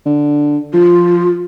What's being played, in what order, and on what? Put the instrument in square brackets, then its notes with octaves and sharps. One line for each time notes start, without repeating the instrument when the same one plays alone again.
[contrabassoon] D3
[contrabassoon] F3 [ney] F4